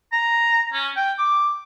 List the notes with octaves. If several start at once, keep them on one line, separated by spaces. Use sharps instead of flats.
A#5
C#4
G5
D6